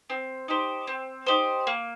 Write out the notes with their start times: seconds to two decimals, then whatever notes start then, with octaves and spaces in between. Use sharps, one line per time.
0.10 C4
0.48 D#4 G4 C5
0.87 C4
1.26 D#4 G4 C5
1.67 A#3